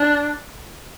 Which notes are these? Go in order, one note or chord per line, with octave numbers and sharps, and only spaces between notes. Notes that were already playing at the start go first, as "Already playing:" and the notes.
Already playing: D4